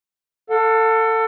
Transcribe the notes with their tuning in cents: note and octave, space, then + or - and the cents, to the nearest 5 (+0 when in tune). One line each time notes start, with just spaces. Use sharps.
A4 +20 F#5 -45